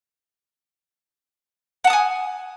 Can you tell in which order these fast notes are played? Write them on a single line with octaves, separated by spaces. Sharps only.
F#5 A5 D#6 G#5